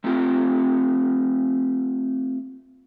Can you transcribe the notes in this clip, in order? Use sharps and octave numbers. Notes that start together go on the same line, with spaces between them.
A3 C4 F4 G4